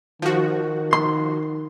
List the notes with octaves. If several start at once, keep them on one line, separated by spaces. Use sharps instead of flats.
D#3 F3 F#4
C6